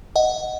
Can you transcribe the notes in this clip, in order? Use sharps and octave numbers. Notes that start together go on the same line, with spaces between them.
D#5 F#5